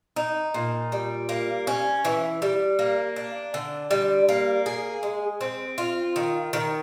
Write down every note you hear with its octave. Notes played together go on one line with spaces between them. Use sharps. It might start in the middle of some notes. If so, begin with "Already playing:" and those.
D#4
A#2
G3
A#3
C#4
E3
G3
A#3
D4
D3
G3
A#3
G#4
G#3
C4
F4
D#3
D#3